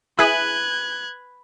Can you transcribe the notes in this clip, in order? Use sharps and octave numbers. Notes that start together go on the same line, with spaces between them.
E4 G#4 B4 F#6 G#6